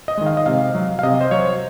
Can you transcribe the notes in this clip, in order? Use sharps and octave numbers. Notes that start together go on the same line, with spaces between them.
D#5
D#3 G#3
F5
D#5
C3 F5
F#3
F5
C3 D#5
C5
F#3 C#5